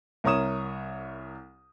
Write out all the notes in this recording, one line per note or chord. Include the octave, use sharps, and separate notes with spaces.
C2 A#4 C#5 D#6 E7